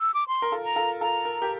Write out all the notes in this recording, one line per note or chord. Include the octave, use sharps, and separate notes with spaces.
E6
D6
C6
A#4
F4 A4
A#5
F4 A4
F4 A4 A#5
A#4
G4 A#4